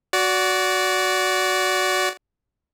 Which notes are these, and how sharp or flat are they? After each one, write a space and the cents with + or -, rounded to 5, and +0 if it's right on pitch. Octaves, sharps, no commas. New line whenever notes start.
F#4 +0 D5 -25